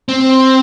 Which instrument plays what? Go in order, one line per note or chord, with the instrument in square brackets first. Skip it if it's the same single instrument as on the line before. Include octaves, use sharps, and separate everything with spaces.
[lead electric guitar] C4